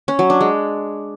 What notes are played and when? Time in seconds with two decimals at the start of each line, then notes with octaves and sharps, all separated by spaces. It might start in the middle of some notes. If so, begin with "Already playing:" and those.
0.08 C#4
0.19 F#3
0.30 D4
0.41 G#3